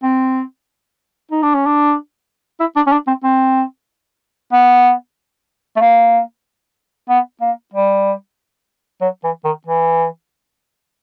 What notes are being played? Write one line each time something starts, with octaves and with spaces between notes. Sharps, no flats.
C4
D#4
D4
C#4
D4
E4
D4
C#4
D4
C4
C4
B3
A3
A#3
B3
A#3
G3
F#3
E3
D#3
E3